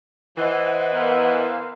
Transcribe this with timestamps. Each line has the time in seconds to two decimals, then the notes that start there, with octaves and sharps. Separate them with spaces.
0.38 E3 C5 D#5 F#5
0.94 B3 A#4 C5 F5